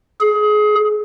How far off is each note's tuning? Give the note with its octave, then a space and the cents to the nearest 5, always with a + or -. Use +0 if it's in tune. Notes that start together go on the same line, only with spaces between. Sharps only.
G#4 +25